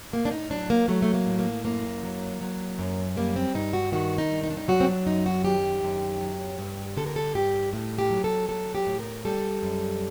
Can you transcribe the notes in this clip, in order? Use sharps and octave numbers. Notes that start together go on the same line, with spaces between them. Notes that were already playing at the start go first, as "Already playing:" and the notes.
A2 A#3
D4
D#4
F#3 D4
A#3
F#3 A3
A3
A#3
A2
A#3
F#2 A#3
F#3
F#3
F#2
G3 A#3
C4
G2 D#4
F#4
D#3 F#4
D#4
G2
D#4
D4
D#4
F#3 F#4
C4
D4
F#2 D#4
F#4
D#3 G4
F#2
F#3
G2
D3 A4
A#4
A4
G2 G4
A2
G4
F#3
A4
F#3 A4
G4
A2
A#4
G3 A4
F#2